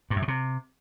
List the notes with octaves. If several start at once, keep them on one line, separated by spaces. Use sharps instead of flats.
G2
F#2
B2
C3